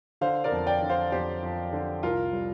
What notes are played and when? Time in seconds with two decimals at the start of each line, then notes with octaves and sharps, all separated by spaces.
0.21 D3 C5 F5
0.44 A#4 D5
0.52 F2
0.67 D5 G5
0.82 D3
0.89 C5 F5
1.12 F2 G4 C5
1.43 F2
1.73 D3
2.03 C2 F4 A#4
2.33 G3